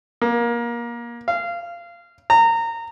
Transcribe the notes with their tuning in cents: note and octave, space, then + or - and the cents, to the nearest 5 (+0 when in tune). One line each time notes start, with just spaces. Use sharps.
A#3 +25
F5 -20
A#5 -25